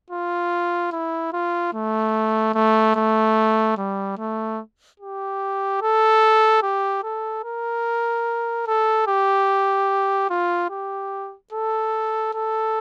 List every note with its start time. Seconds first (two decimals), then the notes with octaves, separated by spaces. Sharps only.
0.10 F4
0.92 E4
1.33 F4
1.73 A3
2.54 A3
2.95 A3
3.77 G3
4.18 A3
5.00 G4
5.82 A4
6.63 G4
7.03 A4
7.44 A#4
8.67 A4
9.07 G4
10.30 F4
10.70 G4
11.52 A4
12.34 A4